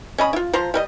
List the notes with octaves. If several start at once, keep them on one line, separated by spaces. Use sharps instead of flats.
C#4 D#5 B5
E4 F4
F3 A#5 C6
G3 A#4 D#5